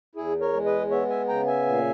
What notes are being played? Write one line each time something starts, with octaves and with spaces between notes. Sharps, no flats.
E2 E4 G#4
A#4 C#5
G#3
B4 D#5
B3 C#5 E5
E5 G#5
C#3 G5 A#5
E5 G#5
A#2